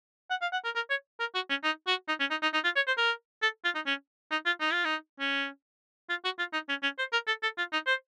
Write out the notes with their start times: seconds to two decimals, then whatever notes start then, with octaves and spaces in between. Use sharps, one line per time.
0.30 F#5
0.42 F5
0.52 F#5
0.64 A#4
0.75 A#4
0.90 C#5
1.20 A#4
1.34 F#4
1.49 C#4
1.63 D#4
1.87 F#4
2.08 D#4
2.20 C#4
2.30 D#4
2.42 D#4
2.54 D#4
2.64 F4
2.76 C#5
2.87 C5
2.97 A#4
3.42 A4
3.64 F4
3.75 D#4
3.86 C#4
4.31 D#4
4.45 F4
4.60 D#4
4.72 F4
4.84 D#4
5.20 C#4
6.09 F4
6.24 F#4
6.39 F4
6.53 D#4
6.69 C#4
6.82 C#4
6.98 C5
7.12 A#4
7.27 A4
7.43 A4
7.58 F4
7.72 D#4
7.87 C5